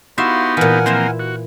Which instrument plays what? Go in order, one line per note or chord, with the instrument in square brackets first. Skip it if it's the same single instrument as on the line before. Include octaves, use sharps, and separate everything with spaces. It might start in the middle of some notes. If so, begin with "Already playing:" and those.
[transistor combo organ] B3 D#4 G4 [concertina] E4 F#4 C6 [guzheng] E5 F5
[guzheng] A#2 E3 [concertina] A#4 F#5 G#5
[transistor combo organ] F3 A#3 C4 [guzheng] E4 C5 E5
[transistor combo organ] F#4